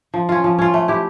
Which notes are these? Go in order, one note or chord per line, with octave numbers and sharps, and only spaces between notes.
F3
C#4 F4
F3
C#4 F4
A3
E4 G4